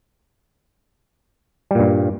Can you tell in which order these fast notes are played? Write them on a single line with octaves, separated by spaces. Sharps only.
G3 A#2 G2